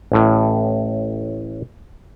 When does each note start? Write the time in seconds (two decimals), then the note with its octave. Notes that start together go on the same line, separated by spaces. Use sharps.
0.12 A1 A2